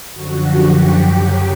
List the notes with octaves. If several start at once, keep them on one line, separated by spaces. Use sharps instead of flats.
F#2 D3 F3 F#4
G4
F#2 C#3 F#3 G4